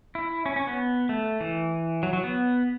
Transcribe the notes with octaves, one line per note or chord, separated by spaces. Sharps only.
E4
C#4
C#4
B3
A3
E3
F#3
F#3
B3